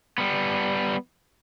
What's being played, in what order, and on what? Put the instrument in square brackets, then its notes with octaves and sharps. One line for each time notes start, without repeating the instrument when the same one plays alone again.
[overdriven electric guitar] G3 B3